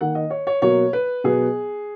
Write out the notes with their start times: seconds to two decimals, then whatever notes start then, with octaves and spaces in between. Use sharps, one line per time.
0.01 D#3 A#3 F#5
0.15 D#5
0.30 C#5
0.47 C#5
0.62 B2 F#3 A#3 C#5
0.93 B4
1.24 B2 F#3 B3 G#4